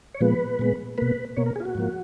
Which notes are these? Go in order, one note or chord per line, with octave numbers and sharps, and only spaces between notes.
C#5
A#2 F3 G#3 B3 B4
A#2 G#3 B3
B2 A#3 B4
B2 A#3 C#5
A#4
G#4
F4
F#4
G#2 F3 A#3